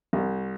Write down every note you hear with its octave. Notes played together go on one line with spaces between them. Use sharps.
C2